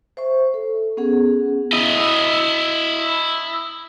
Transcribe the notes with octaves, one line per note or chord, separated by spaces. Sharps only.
C5 E5 C#6
A4
B3 C#4 G#4 F#5
E4 D#5